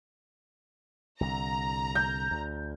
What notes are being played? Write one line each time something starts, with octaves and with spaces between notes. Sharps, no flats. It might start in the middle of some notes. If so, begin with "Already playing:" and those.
C2 D3 A#5
G6
D2